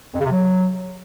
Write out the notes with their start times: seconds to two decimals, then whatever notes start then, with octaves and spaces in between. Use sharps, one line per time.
0.14 F2
0.20 C#3
0.25 C3
0.31 F#3